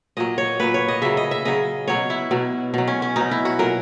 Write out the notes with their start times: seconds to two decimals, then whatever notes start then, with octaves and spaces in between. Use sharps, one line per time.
0.17 A#2 F#3 D#5
0.38 C#5
0.60 A#2 F#3 B4
0.74 C#5
0.88 D#5
1.02 C#3 F#3 E5
1.17 D#5
1.31 E5
1.45 C#3 F#3 D#5
1.88 B2 F#3 C#5
2.10 E4
2.31 B2 F#3
2.74 B2 F#3
2.88 C#4
3.02 C#4
3.16 B2 F#3 D#4
3.31 E4
3.45 F#4
3.59 A#2 F#3 A#4